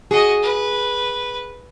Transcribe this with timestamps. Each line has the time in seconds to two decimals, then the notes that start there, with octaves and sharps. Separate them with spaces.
0.11 F#4 G#4 D#5
0.42 B4